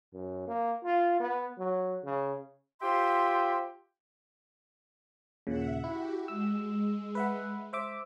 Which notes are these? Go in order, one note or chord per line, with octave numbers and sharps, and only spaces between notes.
F#2
A#3
F4
B3
F#3
C#3
F4 G4 C5 E5 G5 C6
D#2 A#2 C#3 E5 F#5
E4 F#4 G4
G#3 E6
B4 E5 F#5
C5 E5 D6